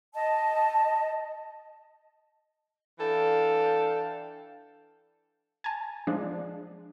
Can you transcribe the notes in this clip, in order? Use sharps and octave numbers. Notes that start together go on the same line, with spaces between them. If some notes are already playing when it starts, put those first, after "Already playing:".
D#5 A5
E3 D4 A4 F5 G5
G#5 A5
F3 G#3 D4